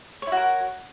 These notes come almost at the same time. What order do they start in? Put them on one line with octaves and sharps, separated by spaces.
C#5 E4 F#4 A#4